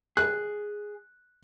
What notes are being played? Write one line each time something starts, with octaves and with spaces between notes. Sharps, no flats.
G#4 F#6